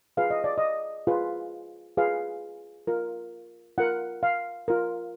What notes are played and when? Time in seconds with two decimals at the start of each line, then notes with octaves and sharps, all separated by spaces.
0.17 F4 G#4 B4 F5
0.30 D#5
0.44 D5
0.58 D#5
1.07 F4 G#4 B4
1.97 F4 G#4 B4 F5
2.87 F4 A#4
3.78 F4 A#4 F#5
4.23 F5
4.68 F4 A#4